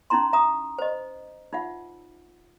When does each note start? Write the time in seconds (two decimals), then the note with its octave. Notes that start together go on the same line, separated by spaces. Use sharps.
0.10 C#4 D#4 E4 A#5 C6
0.33 E5 A#5 D#6
0.79 C5 D#5
1.53 D#4 F4 E5 F#5